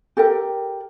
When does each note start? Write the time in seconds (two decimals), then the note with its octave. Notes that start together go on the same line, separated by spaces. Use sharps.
0.17 G4 A4 A#4 G5